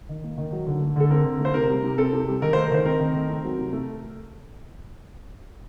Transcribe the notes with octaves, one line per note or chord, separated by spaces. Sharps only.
D#3
A#3
D#3
F#3
D3
A3
D3 A4
C4 A#4
D3
A3
C5
C3 A#4
G3
C3
C4 A4
C3
G3
D#3 A#4
A3 C5
A#4
D#3 C5
C4 A#4
D#3
A3
C4
F#3
C3
A3